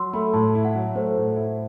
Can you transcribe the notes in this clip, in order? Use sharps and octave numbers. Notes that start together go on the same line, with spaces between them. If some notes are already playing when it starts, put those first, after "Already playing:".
Already playing: F#3 C6 E6
A3 B5
A2 A5
E4
F#5
F#3
A3 C5
A2
E4